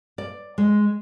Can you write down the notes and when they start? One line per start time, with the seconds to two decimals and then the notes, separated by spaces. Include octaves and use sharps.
0.18 D5
0.58 G#3